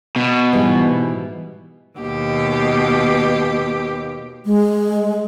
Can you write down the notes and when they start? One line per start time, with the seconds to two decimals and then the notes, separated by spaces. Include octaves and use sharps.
0.16 B2
0.53 G#2 E3 G3
1.97 D#2 B2 G4
4.45 G#3